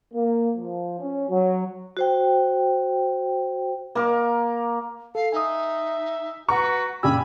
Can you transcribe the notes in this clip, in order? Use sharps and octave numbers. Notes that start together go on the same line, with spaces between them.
A#3
F3
C#4
F#3
F#4 C5 G5
A#3 A#4 D6
A4 F5
D#4 E5 G#5 D#6
F#4 B4 F#5 A#5 C#6
F#2 A#2 C#3 D4 G4 G#5 B5 E6